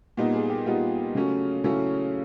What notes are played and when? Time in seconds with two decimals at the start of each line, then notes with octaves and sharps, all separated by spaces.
0.17 A#2 G3 B3 D#4
0.34 G#4
0.50 G4
0.66 A#2 G3 B3 D#4 F4
1.15 C#3 F#3 A3 C#4
1.64 C#3 F#3 A3 C#4 E4